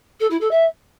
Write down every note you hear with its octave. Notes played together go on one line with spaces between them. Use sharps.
A4
E4
A4
E5